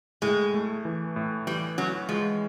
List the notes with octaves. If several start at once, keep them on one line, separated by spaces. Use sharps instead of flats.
A2 G#3
A3
E3
A2
E3 G3
F#3 C#4
F3 G#3